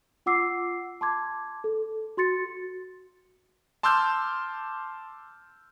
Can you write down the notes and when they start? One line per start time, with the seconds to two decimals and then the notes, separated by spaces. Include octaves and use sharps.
0.26 F4 F#5 D6 E6 C7
1.01 A5 C6 D6 G#6
1.64 A4
2.17 F#4 C6 A6 C#7
3.83 A5 C6 D6 E6 F6 G6